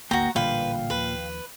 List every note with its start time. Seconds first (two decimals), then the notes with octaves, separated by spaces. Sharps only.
0.11 G#1 D2 A#3 F#4 G5 A#5
0.36 A1 A#2 D3 G3 B4 F5 G5
0.90 D#2 F3 B4